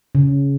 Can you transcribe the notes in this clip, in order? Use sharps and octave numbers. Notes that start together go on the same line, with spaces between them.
C#3